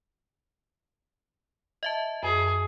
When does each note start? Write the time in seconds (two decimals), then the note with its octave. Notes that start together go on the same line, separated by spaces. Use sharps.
1.83 D#5 E5 A5
2.23 F#2 G#4